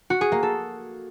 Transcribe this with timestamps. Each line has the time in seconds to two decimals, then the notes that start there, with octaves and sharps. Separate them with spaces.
0.10 F#4
0.21 G#4
0.32 A#3
0.43 A4